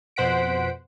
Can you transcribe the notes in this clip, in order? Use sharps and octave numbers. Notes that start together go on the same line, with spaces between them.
F2 B2 C5 F#5 B6 D7